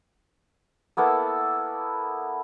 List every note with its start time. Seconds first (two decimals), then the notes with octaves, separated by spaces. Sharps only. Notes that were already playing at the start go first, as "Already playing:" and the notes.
0.97 A#3 B3 E4 A4